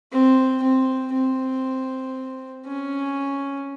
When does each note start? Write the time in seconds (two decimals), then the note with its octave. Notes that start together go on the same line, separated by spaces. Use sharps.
0.12 C4
0.62 C4
1.13 C4
2.66 C#4